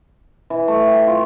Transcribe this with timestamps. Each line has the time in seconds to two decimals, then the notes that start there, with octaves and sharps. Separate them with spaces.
0.50 E3
0.68 A3
0.87 G4
1.07 F4